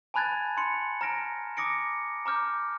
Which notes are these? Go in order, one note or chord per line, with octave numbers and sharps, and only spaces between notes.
G#5 A5 B5 F#6 G#6 A6
B5 C6 C#7
A#5 F6 A#6 D7
D6 D#6 A#6 C#7 D7
A#5 D6 F6 G6